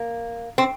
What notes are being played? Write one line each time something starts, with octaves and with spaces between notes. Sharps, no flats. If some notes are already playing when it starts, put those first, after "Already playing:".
Already playing: A#3
C4